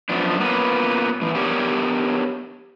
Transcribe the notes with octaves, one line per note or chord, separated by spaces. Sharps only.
F#2 F3 B3 D4
A#3 B3 C#4 F4 B4
A2 E3
B3 D4 G4 A#4 B4 C#5